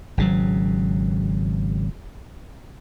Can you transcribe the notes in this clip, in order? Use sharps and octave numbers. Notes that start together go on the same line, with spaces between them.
G#1 C#3 F#3